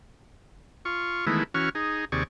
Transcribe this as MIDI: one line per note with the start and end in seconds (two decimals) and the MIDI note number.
0.85 1.25 65
0.85 1.25 85
1.27 1.44 51
1.27 1.44 52
1.27 1.44 56
1.27 1.44 57
1.27 1.44 59
1.27 1.44 64
1.54 1.69 52
1.54 1.69 61
1.54 1.69 66
1.54 1.69 85
1.54 1.69 89
1.75 2.05 63
1.75 2.05 68
2.12 2.23 39
2.12 2.23 48
2.12 2.23 68
2.12 2.23 74
2.12 2.23 85